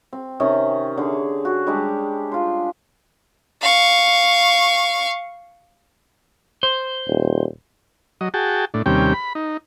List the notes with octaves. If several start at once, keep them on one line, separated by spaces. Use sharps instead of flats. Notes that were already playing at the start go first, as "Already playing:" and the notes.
C4
C3 D#3 C#4 D#5
D3 G#4
F#4
G3 G#3 D4 G4
F4 C6
F5 C#6
C5
D#1
F#3 D#5
F#4 G#4 G5 A5
A2 D4
D#2 C3 G3 C#4 G5
B5
D#4